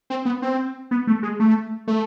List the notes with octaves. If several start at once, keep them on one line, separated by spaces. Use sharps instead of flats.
C4
B3
C4
B3
A3
G#3
A3
A3